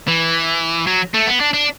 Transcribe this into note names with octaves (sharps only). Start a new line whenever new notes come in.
E3
F#3
A3
B3
D4
D4